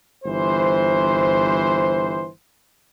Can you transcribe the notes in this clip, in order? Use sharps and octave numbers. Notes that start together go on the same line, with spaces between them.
G1 E3 C5